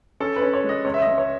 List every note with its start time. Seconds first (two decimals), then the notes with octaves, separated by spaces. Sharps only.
0.20 C#4 A4
0.36 B4
0.42 C#4
0.53 C#5
0.64 G#3
0.69 D#5
0.85 C#2 C#5
0.94 E5
1.02 C#2 D#5
1.18 C#5